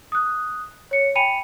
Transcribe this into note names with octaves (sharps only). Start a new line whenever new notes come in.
D#6 F#6
C#5 C#7
G5 G#5 B5 C#7 D#7 F7